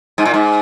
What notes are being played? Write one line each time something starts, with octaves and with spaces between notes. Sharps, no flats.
G#2
A#2
G#2